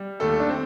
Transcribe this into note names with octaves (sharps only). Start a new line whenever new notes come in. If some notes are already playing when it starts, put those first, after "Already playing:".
Already playing: G3
D#2 A3 A4
D4
C4